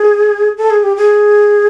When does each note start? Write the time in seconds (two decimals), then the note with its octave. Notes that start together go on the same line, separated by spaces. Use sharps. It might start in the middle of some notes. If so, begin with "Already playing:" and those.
Already playing: G#4
0.57 A4
0.70 G#4
0.83 G4
0.96 G#4